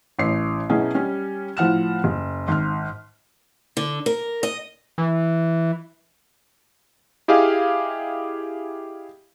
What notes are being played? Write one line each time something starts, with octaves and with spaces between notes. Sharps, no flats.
A1 C#5 C7
B2 F#3 C#4 E4 G#4
G3 C#4
A2 F3 F#5 F6 E7
F#1
G#1 F6
D3
A#4
D#5
E3
E4 G4 G#4 D#5 F5